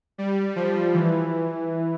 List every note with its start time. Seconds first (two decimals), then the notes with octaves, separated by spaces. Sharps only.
0.18 G3
0.56 F3
0.94 E3